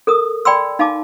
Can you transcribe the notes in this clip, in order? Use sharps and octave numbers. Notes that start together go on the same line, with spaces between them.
A4 A#4 D#6
D5 G5 B5 C6 E6
D#4 F5 G#5 A5 D6